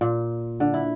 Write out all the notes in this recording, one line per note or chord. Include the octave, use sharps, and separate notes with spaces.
A#2
D3
E4